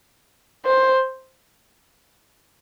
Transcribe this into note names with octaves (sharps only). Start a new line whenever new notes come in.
C5